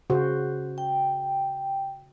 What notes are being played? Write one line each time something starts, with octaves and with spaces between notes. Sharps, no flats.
C#3 F#4 C5
G5